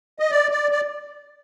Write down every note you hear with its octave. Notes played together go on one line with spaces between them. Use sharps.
D#5
D5
D5
D5